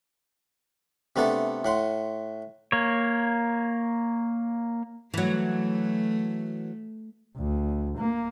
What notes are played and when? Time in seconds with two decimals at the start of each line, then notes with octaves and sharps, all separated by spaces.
1.16 C3 A3 B3 D4 A4
1.65 A2 F#5 C6
2.72 A#3 C#5
5.14 E3 F#3 A3
7.37 D2
7.97 A#3